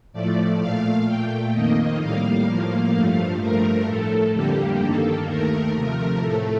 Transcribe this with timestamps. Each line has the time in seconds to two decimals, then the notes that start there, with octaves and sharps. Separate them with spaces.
0.13 A2 F3 A3 D5
0.60 A#2 A3 F5
1.06 A#2 A3 G5
1.53 F2 D#3 A#3 D#5
2.00 A2 G3 A#3 F5
2.47 A2 F3 A#3
2.94 G2 F3 A3
3.40 G2 F3 A3 A#4
3.87 A2 A3 A4
4.34 F2 D3 G3 A#3 G4
4.81 G2 D#3 A#3 A4
5.27 D#2 D#3 A3 A#4
5.75 C3 F3 A3 A#4
6.21 A2 A3 A4